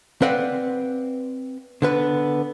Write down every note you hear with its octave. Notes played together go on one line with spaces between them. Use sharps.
C4 B4 D5 F5 F#5
D3 B3 B4